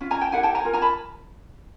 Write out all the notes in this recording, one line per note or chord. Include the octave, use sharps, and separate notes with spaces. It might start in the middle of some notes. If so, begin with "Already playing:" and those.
C#4 F4
G#5 A#5
G5 A5
E4 G4 A#4 F#5 G#5
G5 A5
G#5 A#5
F4 A#4
G#5 A#5
A5 B5